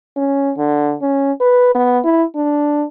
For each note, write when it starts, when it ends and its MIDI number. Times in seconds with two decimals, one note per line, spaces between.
0.16 0.52 61
0.57 0.94 50
1.02 1.32 61
1.41 1.73 71
1.74 1.99 59
2.04 2.23 64
2.35 2.84 62